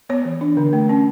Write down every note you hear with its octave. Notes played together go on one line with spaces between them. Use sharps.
B3 C#5
E3
D4
D3
A3
C#4